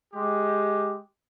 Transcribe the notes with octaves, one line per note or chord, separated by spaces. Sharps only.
G#3 G4